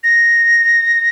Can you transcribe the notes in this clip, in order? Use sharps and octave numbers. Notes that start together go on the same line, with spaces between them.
A#6